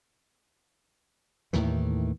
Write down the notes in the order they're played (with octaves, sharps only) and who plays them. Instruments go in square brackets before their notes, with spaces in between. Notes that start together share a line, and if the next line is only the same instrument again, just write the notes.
[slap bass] D#2 A2 D#3 E3